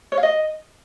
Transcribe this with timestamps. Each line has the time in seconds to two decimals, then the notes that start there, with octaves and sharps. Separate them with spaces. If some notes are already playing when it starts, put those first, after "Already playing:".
0.12 C#5
0.17 F5
0.23 D#5